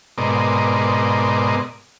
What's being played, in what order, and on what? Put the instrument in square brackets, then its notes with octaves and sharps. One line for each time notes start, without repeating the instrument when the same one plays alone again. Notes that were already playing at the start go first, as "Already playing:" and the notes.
[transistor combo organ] G#2 B2 A#4 C5 D5 D#5